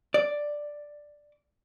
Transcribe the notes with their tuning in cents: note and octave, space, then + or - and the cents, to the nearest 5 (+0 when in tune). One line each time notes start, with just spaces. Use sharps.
D5 +5